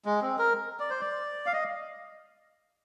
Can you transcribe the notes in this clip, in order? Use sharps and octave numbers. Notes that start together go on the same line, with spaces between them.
G#3
C4
A#4
D5
C5
D5
F5
D#5